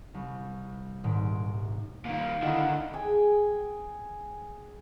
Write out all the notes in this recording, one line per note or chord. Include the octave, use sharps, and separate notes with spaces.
C2
D#1 G#2 D7
A#2 D#3 F5
D3 D#3 D#4 E4 F#5
G#4 G5 G#5